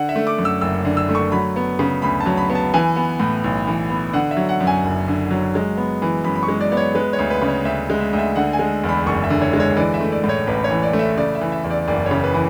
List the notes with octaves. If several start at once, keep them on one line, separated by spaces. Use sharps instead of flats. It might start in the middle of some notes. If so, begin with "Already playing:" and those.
Already playing: D3 F#5
E5
A3
D6
F#2
E6
F#1 E6
D3
E6
A3
C#6
F#3 B5
B3
C#3
D2 B5
A5
F#3
B5
B3
A5
E3 G#5
B3
A2
B1
E3
B3
D3 F#5
E5
F#3
F#5
F#2
G#5
F#1
D3
F#3
G#3
B3
E3
F#2 B5
B5
C#6
G#3
D5
B3 D5
C#5
G#3 B4
C#5
D2
B4
C#3
C#5
D2 E5
G#3
E5
D2
E5
D3 F#5
G#5
G#3
E2
B5
F#1 C#6
E5
D3
C#5
G#3
C#5
E3 D5
E5
A3
D5
A2
C#5
A1 B4
C#5
E3
D5
A3
E5
C#3 D5
E5
E3
E5
E2
D5
F#1 D5
C#5
C#3
B4
E3